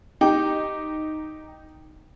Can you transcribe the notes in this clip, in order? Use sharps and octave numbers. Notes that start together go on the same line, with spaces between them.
D#4 G4